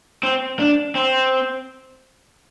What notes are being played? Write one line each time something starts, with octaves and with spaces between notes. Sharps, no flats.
C4
D4
C4